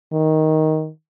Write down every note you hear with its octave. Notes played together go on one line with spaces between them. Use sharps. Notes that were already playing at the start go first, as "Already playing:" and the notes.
D#3